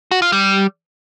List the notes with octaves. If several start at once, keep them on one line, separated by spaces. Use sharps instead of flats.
F#4
F4
G3